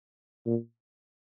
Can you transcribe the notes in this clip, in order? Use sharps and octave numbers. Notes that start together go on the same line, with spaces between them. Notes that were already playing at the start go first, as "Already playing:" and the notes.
A#2